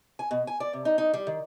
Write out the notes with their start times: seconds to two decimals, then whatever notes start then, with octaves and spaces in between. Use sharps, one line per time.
0.19 G#5
0.31 B2
0.47 G#5
0.60 D5
0.73 C3
0.85 D#4
0.98 D#4
1.14 G3
1.27 D#3